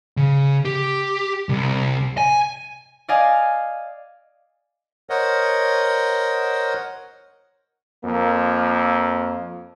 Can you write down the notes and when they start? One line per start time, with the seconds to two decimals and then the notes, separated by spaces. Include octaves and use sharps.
0.17 C#3
0.65 G4
1.49 C2
2.18 G#5
3.09 D5 D#5 F5 G#5
5.10 A#4 C5 C#5 D#5 F#5
8.03 F2 A#3